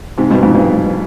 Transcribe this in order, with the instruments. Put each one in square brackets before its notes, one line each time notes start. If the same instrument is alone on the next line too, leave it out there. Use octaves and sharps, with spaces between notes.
[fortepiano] G#2 C3
G2 B2
F2 G#2
G2